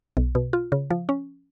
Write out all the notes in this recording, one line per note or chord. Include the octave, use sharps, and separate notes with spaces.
B1
B2
F4
C#3
F3
C#4